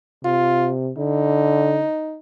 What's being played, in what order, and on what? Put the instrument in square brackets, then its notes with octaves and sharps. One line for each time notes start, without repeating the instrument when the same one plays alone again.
[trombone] C3 [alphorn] F4
[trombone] D3 [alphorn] D#4